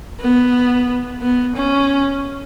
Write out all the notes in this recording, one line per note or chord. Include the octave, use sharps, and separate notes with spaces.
B3
B3
C#4